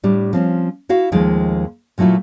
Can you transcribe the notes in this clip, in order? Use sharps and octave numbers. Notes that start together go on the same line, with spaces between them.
A2 G3 D4
F3 C4 C#4
E4 F#4 F5
D#2 F3 G#3 A3 D#4 G5
A#2 F#3 A3 E4 F4